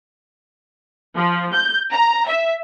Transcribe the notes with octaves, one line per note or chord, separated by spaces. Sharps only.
F3
G6
A#5
E5